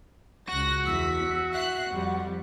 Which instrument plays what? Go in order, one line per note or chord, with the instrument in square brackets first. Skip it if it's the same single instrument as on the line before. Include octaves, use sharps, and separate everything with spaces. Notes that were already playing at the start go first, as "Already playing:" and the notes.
[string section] C#2 F#6 A#6 [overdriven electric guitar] F#4
[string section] E2 B6 [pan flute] E6
[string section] E5 F#6 C7 [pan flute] F#5
[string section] F2 G3